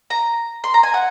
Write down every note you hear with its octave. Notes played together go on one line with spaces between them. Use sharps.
A#5
C6
A#5
G#5
F#5